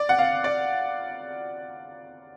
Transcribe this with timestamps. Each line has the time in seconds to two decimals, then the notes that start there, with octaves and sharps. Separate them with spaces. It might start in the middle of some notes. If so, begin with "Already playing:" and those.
Already playing: D5
0.09 F#5
0.19 F5
0.44 D5